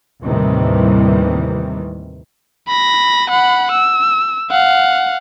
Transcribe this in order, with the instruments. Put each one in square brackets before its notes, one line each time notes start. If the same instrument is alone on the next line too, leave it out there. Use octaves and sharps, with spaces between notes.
[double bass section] D#2 A2 C3 D#3 E3 G3
[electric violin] B5 A#6
F#5 B5
E6
F5 F#5